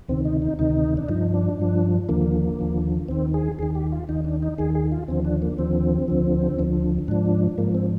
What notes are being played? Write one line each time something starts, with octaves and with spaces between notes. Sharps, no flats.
D2 C3 D#3 C4
D#4
D#4
D2 C3 D#3 D#4
D4
G2 F3 D#4
D4
G2 F3
D#2 D3 F3 A#3
D#2 D3 F3
D#2 D#3 C4
G#4
D#2 D#3 G#4
G4
F4
D#2 D#3 D#4
D4
D#4
D#2 D#3 G#4
G#4
F4
D#2 D3 F3 C4
D4
A#3
D#2 D3 F3 C4
D2 D3 F3
D2 D3 F3
G#2 F3 D4
G#2 F3 A#3
C4